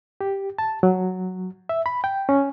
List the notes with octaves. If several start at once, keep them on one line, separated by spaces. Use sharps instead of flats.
G4
A5
F#3
E5
B5
G5
C#4